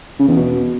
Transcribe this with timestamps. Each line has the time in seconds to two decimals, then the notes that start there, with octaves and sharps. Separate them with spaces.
0.19 C#3
0.28 E2
0.36 B2